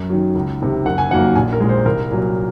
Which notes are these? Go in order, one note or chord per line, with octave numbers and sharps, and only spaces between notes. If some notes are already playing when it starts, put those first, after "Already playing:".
Already playing: F#2
D#3 F#3
C#2
C3 D#3
F#1 F#5
G#5
F2 D#3 F#3 A#3 F#5
A#1 G#5
A#4
A#2 G#3
C5
C2 A#4
A#2 F#3